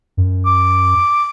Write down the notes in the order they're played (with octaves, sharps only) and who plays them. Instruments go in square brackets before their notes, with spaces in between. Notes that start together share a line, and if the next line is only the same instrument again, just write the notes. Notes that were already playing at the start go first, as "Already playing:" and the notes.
[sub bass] F#2
[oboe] D6